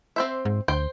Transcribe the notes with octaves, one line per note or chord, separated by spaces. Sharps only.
C4 C5 E5
G#2
D2 C5 G5